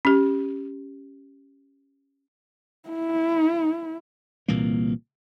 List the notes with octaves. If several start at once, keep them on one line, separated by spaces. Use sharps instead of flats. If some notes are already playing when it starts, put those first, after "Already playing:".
C#4 G4
E4
C2 A#2 E3 A#3